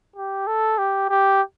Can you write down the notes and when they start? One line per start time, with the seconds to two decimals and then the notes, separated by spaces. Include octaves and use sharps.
0.16 G4
0.47 A4
0.78 G4
1.09 G4